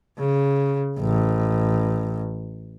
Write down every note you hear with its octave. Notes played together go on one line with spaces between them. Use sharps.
C#3
A1